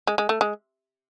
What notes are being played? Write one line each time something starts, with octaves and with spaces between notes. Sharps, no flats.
G#3
G#3
A3
G#3